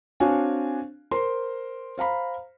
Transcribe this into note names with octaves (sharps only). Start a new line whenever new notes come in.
C4 D4 F#4 C#5 F5 G#5
A#4 C5 C6
C5 F5 A#5 B5